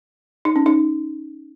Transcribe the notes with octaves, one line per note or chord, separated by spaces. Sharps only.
D#4
C#4
D#4